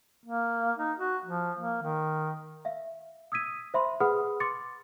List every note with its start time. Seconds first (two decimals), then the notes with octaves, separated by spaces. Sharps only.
0.26 A#3
0.78 D#4
0.98 F#4
1.25 F3
1.59 A#3
1.83 D#3
2.65 E5 F5
3.32 D#6 E6 G#6 B6 D#7
3.74 C5 E5 B5 C6
4.00 G#4 B4 F#5 B5 D#6 F6
4.40 C6 D6 A6 C#7